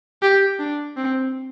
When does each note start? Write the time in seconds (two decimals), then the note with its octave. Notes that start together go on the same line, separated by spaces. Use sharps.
0.22 G4
0.59 D4
0.96 C4